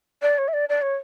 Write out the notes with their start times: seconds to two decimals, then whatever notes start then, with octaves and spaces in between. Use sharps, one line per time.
0.22 D5
0.38 C#5
0.48 E5
0.53 D5
0.69 D5
0.82 C#5